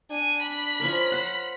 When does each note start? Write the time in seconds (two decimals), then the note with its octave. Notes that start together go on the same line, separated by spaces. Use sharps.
0.11 D4 G#5
0.42 B5
0.80 F3 C#4 A#4
1.12 C5 F5 F#5